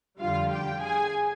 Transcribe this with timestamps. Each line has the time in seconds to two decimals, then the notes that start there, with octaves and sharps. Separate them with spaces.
0.20 F2 D3 G3 F4 F5
0.51 G4 G5
0.81 G#4 G#5